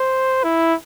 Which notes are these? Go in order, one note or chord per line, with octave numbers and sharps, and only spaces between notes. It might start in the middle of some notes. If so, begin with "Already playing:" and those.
Already playing: C5
E4